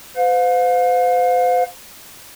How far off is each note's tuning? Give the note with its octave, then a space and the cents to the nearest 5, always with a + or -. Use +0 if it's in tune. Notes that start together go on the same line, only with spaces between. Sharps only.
C5 -45 F5 +35